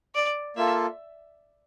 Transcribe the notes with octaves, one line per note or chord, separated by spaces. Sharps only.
D5
A#3 F4 A4 E5